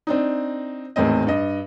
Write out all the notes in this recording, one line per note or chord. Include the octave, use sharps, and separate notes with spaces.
C4 D4 D#4
G#1 E2 A2 C4 D#5
G2 D#5